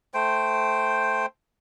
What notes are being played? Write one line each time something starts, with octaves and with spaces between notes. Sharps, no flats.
A3 C5 G5